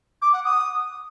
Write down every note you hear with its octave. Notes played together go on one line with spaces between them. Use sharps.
D6
F#5
D#6